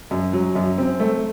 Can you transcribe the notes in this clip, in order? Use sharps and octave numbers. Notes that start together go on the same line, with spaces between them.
F#2
F#3
F#2
C4
A3